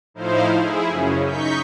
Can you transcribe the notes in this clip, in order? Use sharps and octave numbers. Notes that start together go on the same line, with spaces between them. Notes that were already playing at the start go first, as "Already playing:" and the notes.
A2 F3 D#4 E4 C5 F5
E4 G#4
F#2 C#3 C#4
D#4 C#6 G6 B6